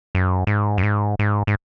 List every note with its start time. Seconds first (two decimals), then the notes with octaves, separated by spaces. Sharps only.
0.15 F#2
0.47 G#2
0.78 F#2
0.83 G#2
1.19 G#2
1.47 G#2